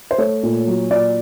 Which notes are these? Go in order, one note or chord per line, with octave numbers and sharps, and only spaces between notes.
C5
A3 C#5
A#2
F#3
A#2 D5